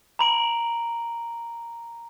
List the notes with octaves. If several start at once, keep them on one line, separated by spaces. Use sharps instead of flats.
A#5 B5 D7 F#7